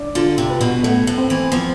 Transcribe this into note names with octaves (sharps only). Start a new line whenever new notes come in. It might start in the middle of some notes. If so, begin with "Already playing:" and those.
Already playing: D4
D3 F4
C3
B4
B2
A2 A3
A2
C4
E3
F3 C4